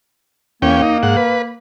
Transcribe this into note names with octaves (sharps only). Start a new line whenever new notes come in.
E2 A#3 C#4 G5
D#4
G#2 F#5
B4